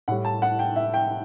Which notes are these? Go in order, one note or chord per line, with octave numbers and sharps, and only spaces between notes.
A2 G3 F#5
A5
F#5
G5
E5
G5